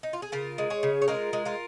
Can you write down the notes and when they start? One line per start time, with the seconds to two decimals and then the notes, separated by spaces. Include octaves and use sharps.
0.03 D#4
0.13 F4
0.22 G#4
0.32 C#3 F4 A#4
0.58 G#3
0.70 G#4 C#5
0.83 C#3
1.02 C#5
1.08 G#3 F4 A#4
1.33 G#3
1.45 F4 A#4